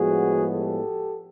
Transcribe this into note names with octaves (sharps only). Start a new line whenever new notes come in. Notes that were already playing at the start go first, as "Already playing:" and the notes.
Already playing: A2 F3 G#3 B3 F#4 G#4
G4 A4